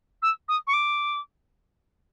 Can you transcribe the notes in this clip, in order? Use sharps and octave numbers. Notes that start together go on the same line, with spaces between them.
E6
D#6
C#6
D6